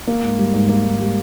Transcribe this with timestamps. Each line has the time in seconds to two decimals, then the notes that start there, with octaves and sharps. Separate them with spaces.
0.07 A#3
0.23 G#2
0.38 G3
0.54 G#2
0.69 A#3
0.84 G#2
0.99 G3